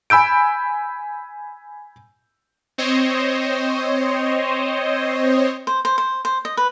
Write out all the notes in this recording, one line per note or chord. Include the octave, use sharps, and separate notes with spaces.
G#5 B5 E6 G6 D7
C4 C5 C#5 D#5
C5
C5
C5
C5
D#5
B4